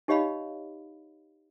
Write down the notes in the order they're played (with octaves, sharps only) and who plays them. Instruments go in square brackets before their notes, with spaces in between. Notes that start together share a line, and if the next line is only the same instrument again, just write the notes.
[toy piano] D#4 G4 C#5 D#5 F5 B5